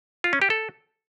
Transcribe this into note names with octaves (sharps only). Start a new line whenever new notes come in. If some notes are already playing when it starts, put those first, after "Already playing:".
F4
C#4
G4
A4